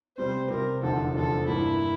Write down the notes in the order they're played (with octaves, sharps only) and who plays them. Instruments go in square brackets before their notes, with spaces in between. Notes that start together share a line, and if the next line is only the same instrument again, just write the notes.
[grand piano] C3 G3 C4 [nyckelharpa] C5
[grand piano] C3 G3 C4 [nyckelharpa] A#4
[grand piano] F1 E2 D3 F3 [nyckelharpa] A4
[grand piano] F1 E2 D3 F3 [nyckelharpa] A4
[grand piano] G2 E3 A#3 D4 [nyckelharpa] E4